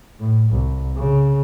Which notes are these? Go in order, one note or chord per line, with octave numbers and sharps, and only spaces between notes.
A2
C2
C#3